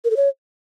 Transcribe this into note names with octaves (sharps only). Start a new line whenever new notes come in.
A#4
A4
C#5